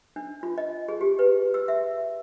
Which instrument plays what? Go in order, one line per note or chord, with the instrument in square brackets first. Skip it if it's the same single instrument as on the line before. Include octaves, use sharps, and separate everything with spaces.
[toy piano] D4
F4
D#5
G#4
G4
B4
E6
E5